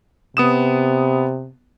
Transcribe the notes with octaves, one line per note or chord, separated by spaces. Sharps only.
C3 B3 D#6 E7